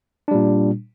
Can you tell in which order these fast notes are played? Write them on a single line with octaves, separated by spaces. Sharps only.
D4 G3 A#2